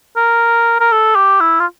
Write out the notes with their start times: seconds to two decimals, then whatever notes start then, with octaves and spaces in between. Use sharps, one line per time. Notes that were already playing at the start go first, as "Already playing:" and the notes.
0.16 A#4
0.80 A#4
0.92 A4
1.15 G4
1.40 E4
1.60 F4